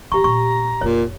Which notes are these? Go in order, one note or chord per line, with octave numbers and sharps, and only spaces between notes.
D3 E3 G4 A#5 C#6
A#2 B3 C#6
F1 A#2 D3 C#5